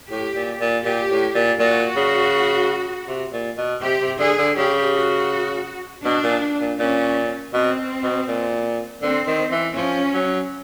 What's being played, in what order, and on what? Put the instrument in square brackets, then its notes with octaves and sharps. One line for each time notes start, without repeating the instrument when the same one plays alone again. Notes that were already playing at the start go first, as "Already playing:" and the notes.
[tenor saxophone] A2 [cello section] G4
[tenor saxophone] A#2
A#2
[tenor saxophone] A#2 [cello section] G4
[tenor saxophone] A2
A#2
[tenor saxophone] A#2 [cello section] F#4
[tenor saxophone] C#3
C3
A#2
B2
[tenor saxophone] C3 [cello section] G4
[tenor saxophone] C3
[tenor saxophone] D3 [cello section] G#4
[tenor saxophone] D3
[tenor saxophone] C#3 [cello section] G4
[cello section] F#4
[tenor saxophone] B2 [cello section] D4
[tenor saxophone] A#2
A#2
[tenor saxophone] A#2 [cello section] C#4
[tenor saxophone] B2 [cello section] C4
[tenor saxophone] B2
A#2
[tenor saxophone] D3 [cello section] C4
[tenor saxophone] D#3
E3
[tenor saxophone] F3 [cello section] C#4
[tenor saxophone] F#3